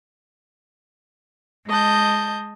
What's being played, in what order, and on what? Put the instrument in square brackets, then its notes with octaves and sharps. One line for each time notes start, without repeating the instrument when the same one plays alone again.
[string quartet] G#3 D#5 A5 G6